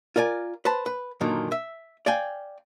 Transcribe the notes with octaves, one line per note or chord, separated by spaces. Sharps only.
F4 A#4 D5 G#5
B4 C5 A5
B4
F#2 A#2 D3 D#3
E5
D5 F5 G5 G#5